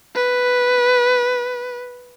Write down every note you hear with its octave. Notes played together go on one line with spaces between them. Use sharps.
B4